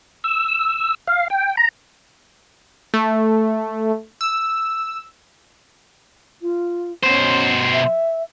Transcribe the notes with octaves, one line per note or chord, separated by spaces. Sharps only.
E6
F5
G5
A#5
A3
E6
F4
B2 C#4 C5
E5